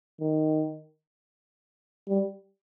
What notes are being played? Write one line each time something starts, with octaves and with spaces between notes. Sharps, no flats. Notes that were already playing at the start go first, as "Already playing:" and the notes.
D#3
G3